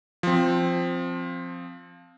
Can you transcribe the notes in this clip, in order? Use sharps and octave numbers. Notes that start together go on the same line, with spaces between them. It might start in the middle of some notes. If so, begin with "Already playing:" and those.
F3 C4